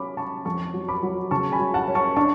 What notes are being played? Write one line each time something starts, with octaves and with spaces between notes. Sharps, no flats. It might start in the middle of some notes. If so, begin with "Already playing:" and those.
Already playing: F#3 C#4 B5 D6
C#4 A5 C#6
F2 A5 C#6
F#3
B5 D6
F#3
C#3 A5 C#6
G#5 B5
F#3
F#5 A5
C#4
A5 C#6
D4 A5 C#6